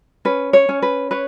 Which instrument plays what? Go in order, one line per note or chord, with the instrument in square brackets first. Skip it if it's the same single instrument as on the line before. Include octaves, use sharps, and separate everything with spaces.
[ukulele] C#4 B4
C#5
C#4
B4
B4 C#5